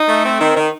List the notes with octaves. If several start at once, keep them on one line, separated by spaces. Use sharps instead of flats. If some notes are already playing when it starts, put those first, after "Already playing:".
Already playing: D#4
A3
C4
D#3
D#3